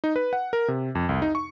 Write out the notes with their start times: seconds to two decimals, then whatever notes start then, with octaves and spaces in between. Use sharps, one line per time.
0.04 D#4
0.16 B4
0.33 F#5
0.53 A#4
0.68 C3
0.95 F2
1.09 C2
1.22 D#4
1.35 C#6